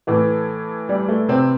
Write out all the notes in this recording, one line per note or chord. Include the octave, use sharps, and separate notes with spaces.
A2 E3 A3
G3
A3
C3 C4